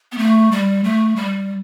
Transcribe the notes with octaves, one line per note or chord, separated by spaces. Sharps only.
B3
A3
G3
A3
G3